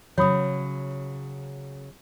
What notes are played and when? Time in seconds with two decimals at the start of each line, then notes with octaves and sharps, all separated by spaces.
0.18 C#3 F#3 C#5 B5 D#6